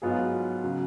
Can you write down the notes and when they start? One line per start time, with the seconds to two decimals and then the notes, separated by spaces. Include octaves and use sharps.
0.02 G#2 F#3 B3 F4 G#4
0.63 C#3 F#3